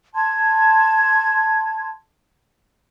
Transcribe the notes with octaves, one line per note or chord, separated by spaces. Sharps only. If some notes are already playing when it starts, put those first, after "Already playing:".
A5 C6 G#6